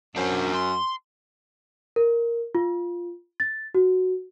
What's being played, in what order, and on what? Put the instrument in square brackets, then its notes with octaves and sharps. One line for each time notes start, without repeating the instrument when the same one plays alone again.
[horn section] F#2 [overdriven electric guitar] D4 C5
[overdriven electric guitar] C6
[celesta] A#4
F4
A6
F#4